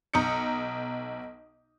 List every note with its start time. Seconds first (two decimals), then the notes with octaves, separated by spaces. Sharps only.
0.14 B1 A#5 D#6 G6 C#7